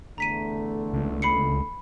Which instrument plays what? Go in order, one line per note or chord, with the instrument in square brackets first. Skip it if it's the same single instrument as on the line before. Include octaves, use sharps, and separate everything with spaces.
[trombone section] E2 D3 A3 [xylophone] A#5 B6 D#7
[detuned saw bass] C#2
[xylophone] B5 C7 C#7